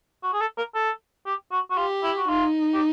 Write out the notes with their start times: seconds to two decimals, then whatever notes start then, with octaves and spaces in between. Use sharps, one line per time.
0.23 F#4
0.33 G#4
0.41 A4
0.58 A#4
0.75 A4
1.26 G4
1.52 F#4
1.71 F#4
1.77 F4 G4
2.03 E4
2.17 F#4
2.29 D#4 F4
2.75 G4